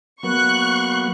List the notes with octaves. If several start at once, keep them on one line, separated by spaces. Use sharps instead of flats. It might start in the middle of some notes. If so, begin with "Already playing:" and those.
F#3 A#3 B3 C#6 F#6